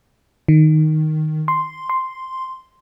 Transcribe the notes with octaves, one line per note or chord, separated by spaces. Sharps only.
D#3
C6
C6